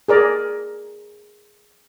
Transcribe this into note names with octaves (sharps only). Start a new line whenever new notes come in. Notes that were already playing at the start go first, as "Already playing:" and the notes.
G#4 A#4 D5